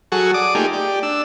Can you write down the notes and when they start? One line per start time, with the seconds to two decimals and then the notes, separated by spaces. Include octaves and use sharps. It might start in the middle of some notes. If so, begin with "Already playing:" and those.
0.12 F#3 F#4 G#4 A4 C#6
0.34 D5 D6 D#6
0.55 A3 A#3 D#4 F4 G4 G#4
0.73 G4 D5
1.03 D4 E6